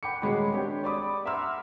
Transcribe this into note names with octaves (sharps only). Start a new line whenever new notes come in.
F#5 G5 B5 D6 C#7
D#1 G#3 F#4 G#4 C#5 B5
C4 D4 G4 C#5
D5 B5 D6 D#6
E5 F#5 A#5 C6 E6 F6